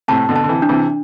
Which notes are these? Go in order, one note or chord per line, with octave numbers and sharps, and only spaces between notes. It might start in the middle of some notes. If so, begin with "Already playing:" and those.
A2 C3 A5
B2 D3
A5
D3
C3 E3
D4
C3 E3